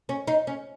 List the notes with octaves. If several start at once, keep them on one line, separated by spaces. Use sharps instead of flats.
C#4
D#4
C#4